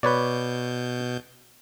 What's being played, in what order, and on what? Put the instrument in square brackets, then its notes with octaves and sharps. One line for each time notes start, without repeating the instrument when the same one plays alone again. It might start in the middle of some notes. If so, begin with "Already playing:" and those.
[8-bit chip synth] B2 G6 [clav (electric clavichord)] B4 C#5 D5